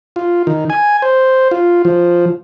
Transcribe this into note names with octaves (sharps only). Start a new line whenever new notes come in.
F4
D#3
G#5
C5
F4
F3